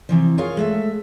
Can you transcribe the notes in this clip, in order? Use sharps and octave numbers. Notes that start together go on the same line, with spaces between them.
C3 E3 F3
F4 G#4 A#4 C#5 F5
G#3 A3 E5